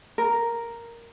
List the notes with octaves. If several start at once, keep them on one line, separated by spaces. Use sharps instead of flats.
A#4